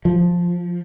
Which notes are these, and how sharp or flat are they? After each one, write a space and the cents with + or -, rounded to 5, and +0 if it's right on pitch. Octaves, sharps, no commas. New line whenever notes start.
F3 +5